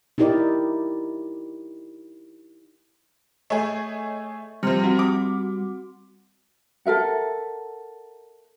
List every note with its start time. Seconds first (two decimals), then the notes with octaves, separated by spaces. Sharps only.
0.18 D#4 E4 G4 A#4 D5
3.50 A3 G#4 C#5 D#5 C#6
4.63 C3 F3 G3 F6 C#7
4.84 C4 F#4
4.99 D6
6.86 A4 A#4 E5 F#5